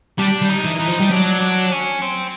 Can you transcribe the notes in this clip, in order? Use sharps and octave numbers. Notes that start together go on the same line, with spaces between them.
G3 D4
G3
D#4
E3
E3 D#4
F3
G3
F#3 D4
D4
C#4
C4